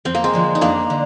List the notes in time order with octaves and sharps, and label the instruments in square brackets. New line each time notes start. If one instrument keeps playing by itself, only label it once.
[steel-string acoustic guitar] F2 [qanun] C4
[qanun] A#3
G#3 C4
[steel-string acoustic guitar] D3 F3
[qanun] D#4
[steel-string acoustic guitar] F2 [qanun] A#3 D4
[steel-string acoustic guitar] D3